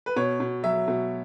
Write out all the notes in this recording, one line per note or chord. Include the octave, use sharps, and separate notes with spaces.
B4
B2 C#5
B2
F#3 E5
B2